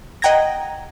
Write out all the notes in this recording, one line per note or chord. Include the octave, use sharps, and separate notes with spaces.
D#5 F#5 G5 A#5 G#6 A#6